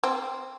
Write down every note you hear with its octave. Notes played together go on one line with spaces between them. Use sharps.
C4